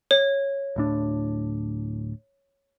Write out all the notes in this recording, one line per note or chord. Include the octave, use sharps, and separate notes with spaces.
C#5
D1 A2 D4